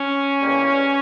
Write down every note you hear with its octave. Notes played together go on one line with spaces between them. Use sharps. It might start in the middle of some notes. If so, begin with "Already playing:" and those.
Already playing: C#4
E2 C#3 G3 A#3